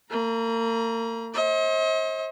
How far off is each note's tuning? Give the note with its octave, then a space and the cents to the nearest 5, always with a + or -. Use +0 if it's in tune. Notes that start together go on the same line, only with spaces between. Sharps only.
A#3 -35 A#5 +35
C5 +40 D#5 +40